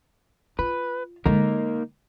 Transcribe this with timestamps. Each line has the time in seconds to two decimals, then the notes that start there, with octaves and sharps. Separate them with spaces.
0.59 F4 B4
1.26 D3 G#3 A#3 D#4 A#4